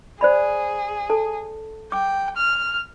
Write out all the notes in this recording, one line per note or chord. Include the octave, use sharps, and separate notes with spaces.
G#4 C5 D5 B5
A4 A5
G5 D6
F6